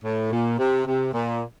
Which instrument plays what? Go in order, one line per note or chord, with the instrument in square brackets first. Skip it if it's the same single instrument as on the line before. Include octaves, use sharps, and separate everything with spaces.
[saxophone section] A2
A#2
C3
C3
A#2